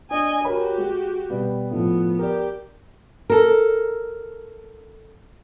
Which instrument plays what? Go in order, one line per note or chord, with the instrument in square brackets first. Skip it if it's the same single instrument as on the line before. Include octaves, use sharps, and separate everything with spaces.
[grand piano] D4 [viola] D#5 G#5
[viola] F#4 G4 [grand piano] A#4 C#5 B5
[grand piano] G#3
B2 G3 B3
[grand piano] A2 F3 [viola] B3
[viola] G4 [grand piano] A#4 D5
[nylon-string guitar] A4 A#4